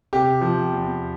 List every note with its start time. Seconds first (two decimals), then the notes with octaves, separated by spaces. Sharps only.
0.13 C3 G4
0.41 F3
0.72 E2